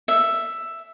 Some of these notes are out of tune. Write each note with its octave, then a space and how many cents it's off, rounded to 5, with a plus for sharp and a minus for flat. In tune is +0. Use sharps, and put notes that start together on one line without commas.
E5 +5